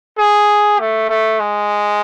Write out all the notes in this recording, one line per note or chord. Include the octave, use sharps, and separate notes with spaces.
G#4
A3
A3
G#3